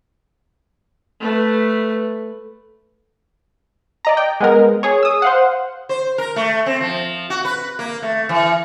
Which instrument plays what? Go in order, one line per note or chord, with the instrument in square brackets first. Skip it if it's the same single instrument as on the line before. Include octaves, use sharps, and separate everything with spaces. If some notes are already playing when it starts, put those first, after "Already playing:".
[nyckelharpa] A3 B4
[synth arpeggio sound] D5 D#5 A#5
G5
G#3 B3 A#4
G#4 C#5
D#6 E6
C5 F5 F#5
[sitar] C5
A#4
A3
C4
F3
F#4
B4
A#3
A3
E3